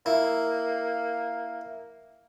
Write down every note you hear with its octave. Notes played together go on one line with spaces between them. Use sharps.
A#3 E4